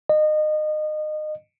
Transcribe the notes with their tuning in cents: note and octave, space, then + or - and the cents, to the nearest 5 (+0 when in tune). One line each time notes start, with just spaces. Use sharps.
D#5 -25